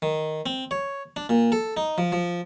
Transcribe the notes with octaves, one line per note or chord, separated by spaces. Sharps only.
D#3
C4
C#5
D4
A#2
A4
D#4
F3
F3